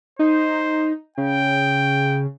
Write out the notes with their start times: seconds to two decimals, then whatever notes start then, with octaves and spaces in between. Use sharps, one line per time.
0.19 D#4 C5
1.18 C#3 G5